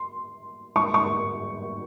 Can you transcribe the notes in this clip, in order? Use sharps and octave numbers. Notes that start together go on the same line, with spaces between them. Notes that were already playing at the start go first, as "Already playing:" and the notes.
Already playing: C6
C#6
C#6